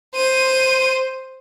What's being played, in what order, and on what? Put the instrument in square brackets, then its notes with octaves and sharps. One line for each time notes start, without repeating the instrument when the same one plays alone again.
[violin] C5 D#7